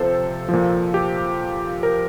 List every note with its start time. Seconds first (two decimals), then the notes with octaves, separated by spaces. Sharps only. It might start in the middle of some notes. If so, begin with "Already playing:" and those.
Already playing: C3 F3 A4 C5
0.49 A#2 F3
0.94 G4
1.83 A#4